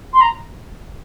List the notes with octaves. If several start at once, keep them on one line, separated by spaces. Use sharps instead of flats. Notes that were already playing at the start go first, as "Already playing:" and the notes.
C6
A#5